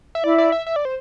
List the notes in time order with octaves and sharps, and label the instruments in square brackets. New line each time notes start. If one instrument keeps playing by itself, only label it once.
[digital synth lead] E5
[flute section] E4 [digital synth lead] D5
[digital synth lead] D5
E5
E5
D5
C5